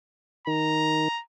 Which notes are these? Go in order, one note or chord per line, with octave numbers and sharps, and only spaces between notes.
D#3 A#5